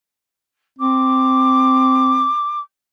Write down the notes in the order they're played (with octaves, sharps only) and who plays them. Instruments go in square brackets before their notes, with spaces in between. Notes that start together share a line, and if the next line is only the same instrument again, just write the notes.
[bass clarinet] C4 [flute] D6